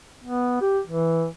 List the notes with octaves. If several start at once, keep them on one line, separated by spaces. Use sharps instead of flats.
B3
G4
E3